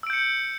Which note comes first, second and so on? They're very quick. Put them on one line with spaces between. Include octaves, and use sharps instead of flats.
E6 D7 G6 C#7